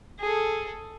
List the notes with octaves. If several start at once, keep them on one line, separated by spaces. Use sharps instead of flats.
G#4 A4